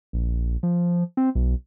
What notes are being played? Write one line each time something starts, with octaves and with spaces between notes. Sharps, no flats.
A#1
F3
C4
B1